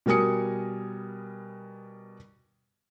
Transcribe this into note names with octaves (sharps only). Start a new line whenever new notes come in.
B2 G3 A#4 G#5 D#6 C#7